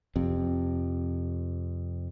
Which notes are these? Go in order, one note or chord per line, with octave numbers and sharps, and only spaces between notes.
F2 C3